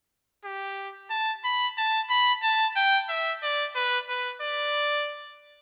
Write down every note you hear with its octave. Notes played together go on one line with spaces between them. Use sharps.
G4
A5
B5
A5
B5
A5
G5
E5
D5
B4
B4
D5